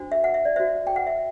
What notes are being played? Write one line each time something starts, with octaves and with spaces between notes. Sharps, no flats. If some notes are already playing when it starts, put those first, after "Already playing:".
Already playing: D4 F#4 C5
E5
F#5
E5
D5
F#4 C5 E5
G5
F#5
E5